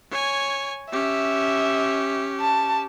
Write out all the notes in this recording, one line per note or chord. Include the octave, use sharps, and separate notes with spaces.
C#5 G#5
C#4 G4 E5
A5